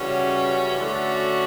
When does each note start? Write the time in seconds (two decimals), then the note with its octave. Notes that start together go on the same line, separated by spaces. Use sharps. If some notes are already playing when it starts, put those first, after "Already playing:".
Already playing: C#3 E3 G3 C#4 F#4
0.79 D3 A3 C#4 F#4